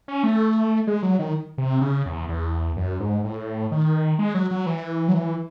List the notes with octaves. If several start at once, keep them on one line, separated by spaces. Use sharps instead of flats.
C#4
A3
G#3
F#3
D#3
C3
C#3
E2
E2
F#2
G#2
A2
D#3
G#3
F#3
F#3
E3
F#3
E3